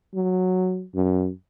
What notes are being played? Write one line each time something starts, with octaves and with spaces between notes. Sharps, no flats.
F#3
F#2